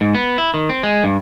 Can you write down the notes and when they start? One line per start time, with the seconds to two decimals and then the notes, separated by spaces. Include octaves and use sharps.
0.01 G#2
0.15 B3
0.38 E4
0.54 D#3
0.69 C4
0.83 G#3
1.04 G2